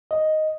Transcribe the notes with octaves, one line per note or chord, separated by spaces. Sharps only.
D#5